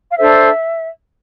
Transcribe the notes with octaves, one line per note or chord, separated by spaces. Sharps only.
F5
D4 A4 C5 E5